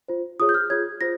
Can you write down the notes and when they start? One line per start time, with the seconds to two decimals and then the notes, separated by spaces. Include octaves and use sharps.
0.08 F4 C5
0.40 F4 G#4 C#5 D#6
0.49 G6
0.54 F6
0.70 F4 G#4 C#5 G#6
1.01 F4 C5 A#6